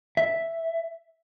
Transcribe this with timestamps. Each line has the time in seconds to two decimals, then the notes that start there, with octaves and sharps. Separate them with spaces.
0.17 E5